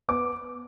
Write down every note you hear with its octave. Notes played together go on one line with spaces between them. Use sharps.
B3 D6